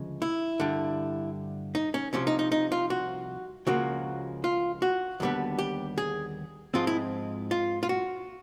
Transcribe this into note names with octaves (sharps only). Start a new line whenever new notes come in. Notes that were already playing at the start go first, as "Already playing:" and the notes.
Already playing: D2 C#3 F3 G#3
E4
G2 D3 G3
D#4
C#4
C2 C3 F3 C#4
D#4
D#4
D#4
F4
F#4
C#2 C#3 F3 A#3 F#4
F4
F#4
D#2 D3 G3 B3
G4
G#4
G#2 F3 G#3 C4 F4
E4
F4
F4
F#4